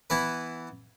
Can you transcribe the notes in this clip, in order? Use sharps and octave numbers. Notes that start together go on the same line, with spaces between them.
E3 B3 E4 B4